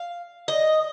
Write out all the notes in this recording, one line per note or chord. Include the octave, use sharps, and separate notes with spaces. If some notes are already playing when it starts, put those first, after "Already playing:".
Already playing: F5
D#5